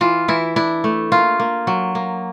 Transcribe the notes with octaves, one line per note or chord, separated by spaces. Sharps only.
E3 F4
E3 E4
D4 E4
A3
A#3 F4
A#3
F#3
A#3